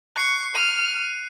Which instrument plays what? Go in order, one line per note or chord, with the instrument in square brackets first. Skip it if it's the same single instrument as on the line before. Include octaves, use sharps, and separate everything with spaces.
[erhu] C#6 [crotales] F#6 C7 C#7
[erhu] F6 [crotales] D#7